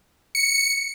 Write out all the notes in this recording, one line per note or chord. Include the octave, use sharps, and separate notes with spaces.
C#7